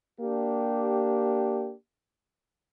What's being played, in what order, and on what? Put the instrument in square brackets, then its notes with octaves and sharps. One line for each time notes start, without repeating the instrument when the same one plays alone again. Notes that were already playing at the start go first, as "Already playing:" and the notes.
[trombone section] A#3 D4 G4